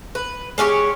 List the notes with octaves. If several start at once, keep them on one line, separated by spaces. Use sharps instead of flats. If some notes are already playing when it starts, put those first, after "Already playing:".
B4
G#3 C#4 G4 C#5